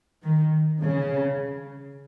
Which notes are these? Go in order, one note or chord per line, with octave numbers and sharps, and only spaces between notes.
D#3
C#3